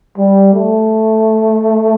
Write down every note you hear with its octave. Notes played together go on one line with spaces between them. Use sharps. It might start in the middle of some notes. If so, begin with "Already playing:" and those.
G3
A3